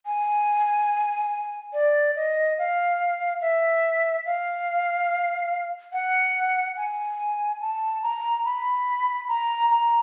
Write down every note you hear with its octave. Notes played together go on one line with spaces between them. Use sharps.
G#5
D5
D#5
F5
E5
F5
F#5
G#5
A5
A#5
B5
A#5
A#5